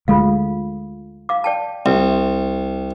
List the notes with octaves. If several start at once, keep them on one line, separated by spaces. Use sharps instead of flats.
D2 G#3 F4 A4 F5
F5 D6
D5 G5 A5
C2 E5